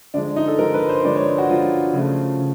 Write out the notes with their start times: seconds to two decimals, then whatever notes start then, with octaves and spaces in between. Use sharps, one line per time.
0.14 D3 F3 G#3 D4
0.36 D#4
0.48 A4
0.59 D3 F3 G#3 A#4
0.74 B4
0.89 C5
1.03 D3 F3 G#3 D5
1.15 C#5
1.38 F#4
1.49 D3 F3 G#3 F4
1.94 C#3 F3 A3
2.39 C#3